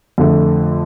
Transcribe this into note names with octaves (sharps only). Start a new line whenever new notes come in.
F2 D3 A3